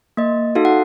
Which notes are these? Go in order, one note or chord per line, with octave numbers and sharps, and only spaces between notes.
A#3 D#5
D#4 F#4 A4 F5
F#5